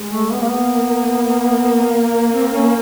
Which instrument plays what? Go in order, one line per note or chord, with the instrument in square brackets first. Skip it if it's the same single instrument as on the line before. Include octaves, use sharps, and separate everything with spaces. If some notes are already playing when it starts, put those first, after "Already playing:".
Already playing: [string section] G#3
[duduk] A3
B3
A#3
B3
[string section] A#3
[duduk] C4
C#4